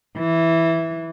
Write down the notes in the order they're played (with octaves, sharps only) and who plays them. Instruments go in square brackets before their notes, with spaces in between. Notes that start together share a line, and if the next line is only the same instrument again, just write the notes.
[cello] E3